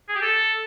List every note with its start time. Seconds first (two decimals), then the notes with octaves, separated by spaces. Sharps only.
0.09 G#4
0.15 G4
0.22 A4